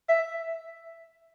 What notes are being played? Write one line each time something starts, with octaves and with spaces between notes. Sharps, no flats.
E5